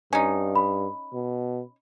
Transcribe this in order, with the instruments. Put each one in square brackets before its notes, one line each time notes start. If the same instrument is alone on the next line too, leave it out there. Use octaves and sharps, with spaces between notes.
[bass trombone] G2 [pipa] C#4 D#4
[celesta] B5
[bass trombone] B2